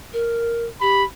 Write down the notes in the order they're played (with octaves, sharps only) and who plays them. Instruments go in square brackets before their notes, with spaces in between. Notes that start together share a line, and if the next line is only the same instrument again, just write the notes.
[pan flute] A#4
[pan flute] G4 [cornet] B5